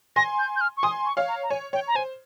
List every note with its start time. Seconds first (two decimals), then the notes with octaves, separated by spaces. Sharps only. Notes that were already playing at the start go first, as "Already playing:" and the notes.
0.16 G#5 C6 A#6
0.39 G6
0.56 G6
0.61 F6
0.77 C#6
0.83 G#5 C6 D#6
1.05 C#6
1.17 C#5 F5
1.28 A#5
1.43 A#5
1.50 C#5 G#5
1.73 C#5 G5
1.87 A#5
1.95 C5 G#5